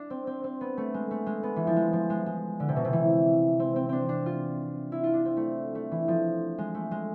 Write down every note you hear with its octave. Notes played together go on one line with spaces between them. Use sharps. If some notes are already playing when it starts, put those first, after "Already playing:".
Already playing: D4
C4
C4
C4
B3
A3
G#3
A3
G#3
B3
E3
F3
G#3
F3
G#3
G#3
D3
C3
B2
C3
E3
C4
C4
C4 D4
D4
F4
E4
F4
D4
C4
A3
A3
E3
F3
G#3
A3
G#3